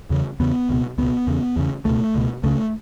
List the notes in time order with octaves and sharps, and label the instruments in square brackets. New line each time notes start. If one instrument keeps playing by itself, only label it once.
[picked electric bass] E2 C#3
E2 C#3 B3
C#2 B2
C#2 B2 B3
E2 C#3
E2 C#3
C#2 B2 A3
C#2 B2
C#2 C#3 A3